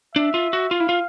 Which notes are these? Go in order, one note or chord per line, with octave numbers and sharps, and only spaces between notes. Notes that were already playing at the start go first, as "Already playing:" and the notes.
D4 E5
F4
F#4
F4 F5
E4
F4